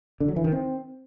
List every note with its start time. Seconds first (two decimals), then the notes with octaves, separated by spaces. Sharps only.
0.20 D3
0.28 F#3
0.36 E3
0.44 D#3
0.52 C4